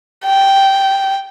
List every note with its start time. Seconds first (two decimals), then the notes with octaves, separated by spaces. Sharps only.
0.25 G5